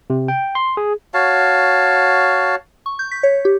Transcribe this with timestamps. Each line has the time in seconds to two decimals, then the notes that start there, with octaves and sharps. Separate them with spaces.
0.10 C3
0.28 G5
0.55 C6
0.77 G#4
1.14 F#4 C#5 F5 A5
2.86 C#6
2.99 G6
3.12 B6
3.23 C#5
3.45 G4